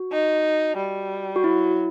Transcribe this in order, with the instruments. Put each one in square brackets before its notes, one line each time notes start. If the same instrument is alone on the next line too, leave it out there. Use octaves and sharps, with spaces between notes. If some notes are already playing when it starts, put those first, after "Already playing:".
Already playing: [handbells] F#4
[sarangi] D#4
G3
[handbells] F#4
[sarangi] F#3 [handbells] E4